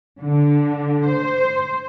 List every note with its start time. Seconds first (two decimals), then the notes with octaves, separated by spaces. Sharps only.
0.21 D3
1.06 C5